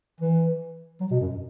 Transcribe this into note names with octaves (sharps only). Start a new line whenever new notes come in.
E3
F#3
B2
F#2